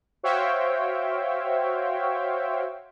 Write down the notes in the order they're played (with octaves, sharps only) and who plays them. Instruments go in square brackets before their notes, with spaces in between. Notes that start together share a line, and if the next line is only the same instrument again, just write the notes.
[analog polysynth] F#4 C5 C#5 E5 F5 G5